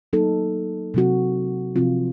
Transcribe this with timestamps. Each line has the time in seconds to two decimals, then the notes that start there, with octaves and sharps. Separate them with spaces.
0.13 F#3 A#3 D#4 A4
0.94 C3 F#3 C4 F#4
1.76 C3 F3 C4 F4